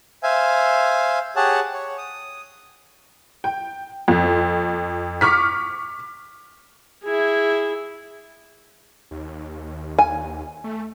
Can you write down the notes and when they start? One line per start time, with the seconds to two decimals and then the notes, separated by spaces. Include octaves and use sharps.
0.23 C5 E5 F5 G#5
1.36 G4 G#4 C#5 F#5 A5
1.73 C#5
1.98 D#6
3.44 G5
4.08 F2
5.21 C#6 D6 F6 B6
7.04 E4 G#4
9.11 D#2
9.99 G#5
10.64 A3